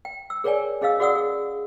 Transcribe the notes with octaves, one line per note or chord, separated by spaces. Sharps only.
G5
E6
G#4 A#4 C#5 D5 G5 G#5
C#4 G#4 D#5 F5 E6
F#4 G#4 D5 F#5 D#6 E6
G#4